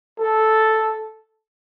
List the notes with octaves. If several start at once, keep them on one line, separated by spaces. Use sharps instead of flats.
A4